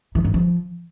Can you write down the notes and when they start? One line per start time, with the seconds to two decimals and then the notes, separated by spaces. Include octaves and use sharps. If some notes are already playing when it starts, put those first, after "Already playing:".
0.15 E3
0.24 G2
0.34 F3